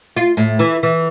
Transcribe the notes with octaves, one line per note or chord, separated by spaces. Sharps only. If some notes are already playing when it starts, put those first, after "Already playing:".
F4
A2
E3
E3